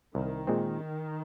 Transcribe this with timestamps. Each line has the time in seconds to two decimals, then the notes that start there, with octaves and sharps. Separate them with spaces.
0.14 C2 D#3
0.47 A#2 G#3 C4